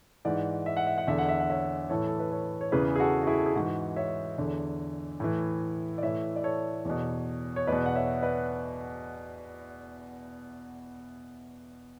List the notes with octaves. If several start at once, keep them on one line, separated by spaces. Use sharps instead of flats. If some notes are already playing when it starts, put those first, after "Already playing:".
G#2 E3 D5 F#5
E5
F#5
E5
F#5
E2 D3 E5
F#5
E5
F#5
C#5 E5
A2 E3 A4 C#5
A4
B4
A4 C#5
C#5
E2 C#3 E3 G#4 B4
G#4
F#4 A4
F#4
E4 G#4
A4
G#4
G#2 E3 F#4
C#5 E5
E2 D3
A2 E3
D5
A2 E3 C#5 E5
D5
A4 C#5
E2 B2
C#5
E2 B2 B4 D5
F#5
C#5 E5
B4 D5